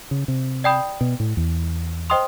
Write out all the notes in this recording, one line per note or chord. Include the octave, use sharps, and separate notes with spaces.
C#3
C3
D5 G5 B5 D#6 G6
B2
A2
E2
C5 D#5 G5 C6 D#6